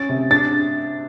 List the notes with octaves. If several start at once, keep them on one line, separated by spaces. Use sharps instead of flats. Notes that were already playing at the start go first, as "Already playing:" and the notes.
Already playing: C#4 A6
C3
D4 A6